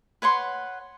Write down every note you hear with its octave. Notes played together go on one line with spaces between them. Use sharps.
B4 C#5 F#5 C6